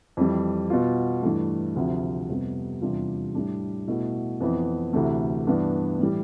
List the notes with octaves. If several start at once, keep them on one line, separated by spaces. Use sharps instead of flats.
F2 E3 G3
B2 B3 F4
G2 E3 A3
D2 C3 F3 C4
F2 C3 G3 B3
E2 C3 G3 D4 F4
A2 G3 D4
B2 A3 E4
F2 E3 B3
D2 C3 E3 A3
G2 E3 B3 D4
A2 E3 G3